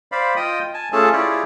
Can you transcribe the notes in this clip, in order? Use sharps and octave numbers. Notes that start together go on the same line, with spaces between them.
C5 D5 F5 B5
F4 D#5 G5 D#6
G#5 A5
A3 C#4 F4 G#4 A4 A5
E4 F4 G4 G#4 C#5 D5